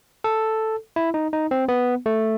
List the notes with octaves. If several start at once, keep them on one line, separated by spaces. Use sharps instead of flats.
A4
E4
D#4
D#4
C4
B3
A3